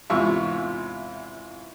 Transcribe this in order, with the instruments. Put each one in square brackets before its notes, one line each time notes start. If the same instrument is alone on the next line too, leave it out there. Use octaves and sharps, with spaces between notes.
[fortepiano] E2 G#2 C3 F4 E5 C#6